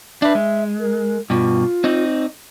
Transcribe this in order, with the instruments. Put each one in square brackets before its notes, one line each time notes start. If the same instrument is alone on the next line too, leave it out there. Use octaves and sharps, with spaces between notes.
[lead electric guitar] D4 B4 [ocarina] E5
[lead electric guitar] G#3
[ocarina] A#4
[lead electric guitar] G2 B2 [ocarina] F4
[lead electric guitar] C4 D#4